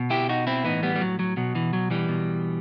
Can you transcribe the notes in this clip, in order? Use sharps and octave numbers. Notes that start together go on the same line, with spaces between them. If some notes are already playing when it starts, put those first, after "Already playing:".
Already playing: B2
E4 G4
D#4 F#4
C4 E4
A2 E3 B3 D#4
G3 B3
G3
F#3
F#3
B2 F#3
E3
F#3
E3 G3
B2